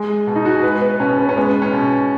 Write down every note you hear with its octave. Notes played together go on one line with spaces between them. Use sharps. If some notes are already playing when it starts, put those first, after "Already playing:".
Already playing: G#3 G#4
B2
D#4
F#4
G#4
G#3 B4
B3
B2 C#4
B3
C#4
G#3 B3
C#4
B2